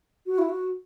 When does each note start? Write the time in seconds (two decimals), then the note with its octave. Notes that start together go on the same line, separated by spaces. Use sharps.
0.26 F#4
0.38 E4
0.49 F#4